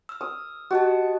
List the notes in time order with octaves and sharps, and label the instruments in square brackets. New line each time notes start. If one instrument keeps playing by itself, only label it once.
[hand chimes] E6 F6
[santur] D#6
[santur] F#4 [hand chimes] G4 D#5 A5